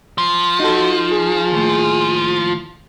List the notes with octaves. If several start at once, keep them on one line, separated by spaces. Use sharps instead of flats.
F3
D#4 F#4 A4
G#4
D#2 A2